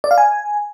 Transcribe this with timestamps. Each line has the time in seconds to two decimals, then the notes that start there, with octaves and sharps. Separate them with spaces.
0.04 D5
0.11 F5
0.18 G#5